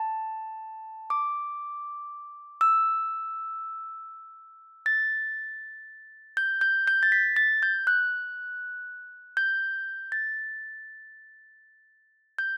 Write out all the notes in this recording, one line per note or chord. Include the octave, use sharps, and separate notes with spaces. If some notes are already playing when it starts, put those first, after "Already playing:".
Already playing: A5
D6
E6
A6
G6
G6
G6
A6
B6
A6
G6
F#6
G6
A6
G6